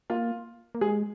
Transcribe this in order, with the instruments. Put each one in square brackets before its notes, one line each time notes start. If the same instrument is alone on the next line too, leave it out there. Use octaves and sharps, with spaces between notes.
[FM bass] A#3 [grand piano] F4
[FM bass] A#3
[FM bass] G#3 [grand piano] G#4